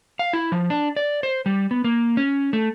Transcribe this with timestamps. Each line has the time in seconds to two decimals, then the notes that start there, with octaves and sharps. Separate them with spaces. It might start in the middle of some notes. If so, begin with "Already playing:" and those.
0.19 F5
0.33 E4
0.52 F3
0.70 D4
0.97 D5
1.23 C5
1.46 G3
1.71 B3
1.84 A#3
2.17 C#4
2.53 A3